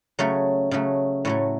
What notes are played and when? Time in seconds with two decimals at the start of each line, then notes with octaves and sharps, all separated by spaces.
0.19 C#3 F#3 A3 C#5
0.71 C#3 F#3 A3
1.25 A2 F#3 A3 C#5